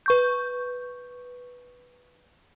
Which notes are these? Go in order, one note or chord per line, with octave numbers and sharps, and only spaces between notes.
B4 C#6 G6